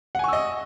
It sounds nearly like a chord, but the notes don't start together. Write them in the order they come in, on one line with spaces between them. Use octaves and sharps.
F#5 G#5 C#6 E6 D#5